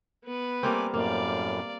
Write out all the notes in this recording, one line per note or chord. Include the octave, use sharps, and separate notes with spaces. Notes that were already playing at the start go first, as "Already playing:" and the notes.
B3 B4
G3 A3 A#3 C4 G#5 D6
F#2 A2 A#3 D5 F5